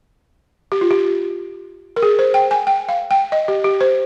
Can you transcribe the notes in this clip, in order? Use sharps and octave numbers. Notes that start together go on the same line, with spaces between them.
G4
F4
G4
A#4
G#4
C5
G5
G#5
G5
F5
G5
D#5
G4
G4
C5